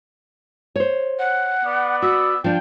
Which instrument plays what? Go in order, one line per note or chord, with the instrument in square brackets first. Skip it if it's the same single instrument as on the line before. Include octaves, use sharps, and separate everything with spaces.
[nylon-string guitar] C5 C#5
[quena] F#5
[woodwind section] B3 D5
[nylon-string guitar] F#4 [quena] E6
[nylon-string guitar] F3 D4 [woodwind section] G5